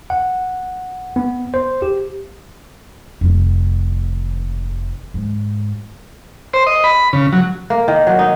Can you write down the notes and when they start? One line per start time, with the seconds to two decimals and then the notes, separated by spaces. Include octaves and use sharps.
0.10 F#5
1.16 B3
1.54 C5
1.82 G4
3.21 F1 D#3
5.14 G#2
6.54 C5
6.67 D#5
6.84 B5
7.13 C#3
7.33 F#3
7.70 A#3
7.88 D#3
8.07 F#3
8.19 D#4